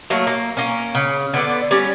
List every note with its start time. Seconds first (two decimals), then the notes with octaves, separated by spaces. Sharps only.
0.10 F#3 A3 A#3
0.27 A#3
0.57 A#3 C#4
0.95 C#3
1.33 D3 B3 D5
1.71 G3 C#4